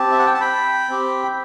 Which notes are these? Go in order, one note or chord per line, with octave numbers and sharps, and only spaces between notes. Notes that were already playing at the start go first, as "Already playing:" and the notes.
Already playing: C4 G4 A5
E5
F#5
G5
A5
G5 B5
C4 G4